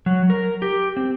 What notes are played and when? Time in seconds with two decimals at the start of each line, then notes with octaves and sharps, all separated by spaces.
0.06 F#3
0.30 A#4
0.62 G4
0.97 C4